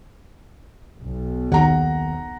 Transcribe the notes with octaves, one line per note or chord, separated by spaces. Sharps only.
B1
D#2 F#5 A#5